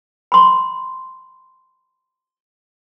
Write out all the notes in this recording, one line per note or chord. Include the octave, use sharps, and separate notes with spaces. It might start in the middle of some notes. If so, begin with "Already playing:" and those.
B5 C6